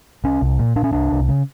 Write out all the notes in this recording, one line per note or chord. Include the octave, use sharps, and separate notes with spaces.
C2 C#4
C2
A#2
A#2 D4
C#4
C2 D4
C2
C#3